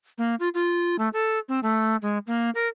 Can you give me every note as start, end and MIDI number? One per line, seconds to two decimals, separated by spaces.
0.18 0.35 58
0.40 0.49 65
0.54 0.96 65
0.99 1.09 57
1.13 1.39 69
1.49 1.60 60
1.63 1.96 57
2.02 2.18 56
2.27 2.50 58
2.55 2.68 70